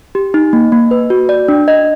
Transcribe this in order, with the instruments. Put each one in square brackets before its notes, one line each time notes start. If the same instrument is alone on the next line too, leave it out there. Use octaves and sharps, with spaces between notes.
[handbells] G4
D#4
A#3
A#3
B4
F#4
D5
D4
D#5